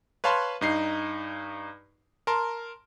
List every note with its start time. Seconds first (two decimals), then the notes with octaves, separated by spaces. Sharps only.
0.24 B4 C#5 F5 A5 B5 C6
0.61 G2 D#4 C7
2.27 A#4 A5 C6